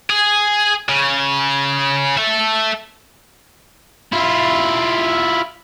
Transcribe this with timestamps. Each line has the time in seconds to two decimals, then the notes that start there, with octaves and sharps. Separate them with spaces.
0.10 G#4
0.89 C#3
2.18 A4 E5
4.13 E4 F4